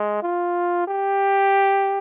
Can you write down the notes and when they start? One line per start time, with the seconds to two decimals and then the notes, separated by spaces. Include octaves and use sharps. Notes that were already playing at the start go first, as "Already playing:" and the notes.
Already playing: G#3
0.23 F4
0.88 G4